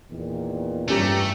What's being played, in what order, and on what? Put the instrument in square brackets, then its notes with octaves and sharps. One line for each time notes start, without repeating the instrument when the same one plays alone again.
[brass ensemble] E2 A#2 D#3
[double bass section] G2 [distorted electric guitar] A3 [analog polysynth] C#4 G4 A#5